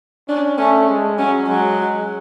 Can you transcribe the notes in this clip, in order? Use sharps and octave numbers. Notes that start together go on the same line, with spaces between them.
C#4 D4
A3 C#4
G#3
F#3 C#4
F#3 G#3